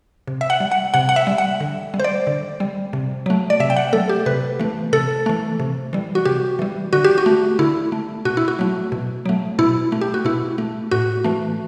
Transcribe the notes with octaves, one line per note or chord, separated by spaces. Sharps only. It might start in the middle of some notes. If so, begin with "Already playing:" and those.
C3
E5
F#5
G3
F#5
C3 F#5
F#5
E5
G3
F#5
D3
G3
C5
D5
D3
G3
C3
F#3 A3
D5
C3 E5
G5
F#5
F#3 A3 A4
G4
C3 B4
E3 A3
C3 A4
E3 A3
C3
E3 G3
F#4
C3 G4
E3 G3
D3 F#4
G4
F#4
A3
D3 E4
A3
B2 F#4
E4
F#4
F#3 A3
B2
F#3 A3
B2 E4
A3
G4
F#4
B2 E4
A3
A2 F#4
E3 A3